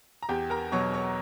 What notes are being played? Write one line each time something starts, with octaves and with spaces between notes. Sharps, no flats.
A#5
E2 G4 G5
A#4 A#5
B2 F#3 C#5 C#6
C#5 C#6